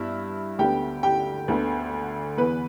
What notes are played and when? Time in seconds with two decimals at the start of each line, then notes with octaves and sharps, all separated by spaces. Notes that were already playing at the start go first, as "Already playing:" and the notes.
Already playing: G2 G3 B3 E4 E5
0.59 D2 D3 B3 G4 G5
1.03 G4 G5
1.48 D2 D3 B3
2.37 E2 E3 B3 B4